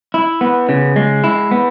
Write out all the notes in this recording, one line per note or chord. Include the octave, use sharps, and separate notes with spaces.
E4
B3
C#3
G#3
E4
B3